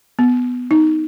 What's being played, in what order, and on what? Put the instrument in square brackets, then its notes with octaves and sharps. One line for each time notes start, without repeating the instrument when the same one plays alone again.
[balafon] B3
D#4